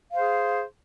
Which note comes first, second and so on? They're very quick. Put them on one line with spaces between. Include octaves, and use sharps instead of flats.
F5 C5 G#4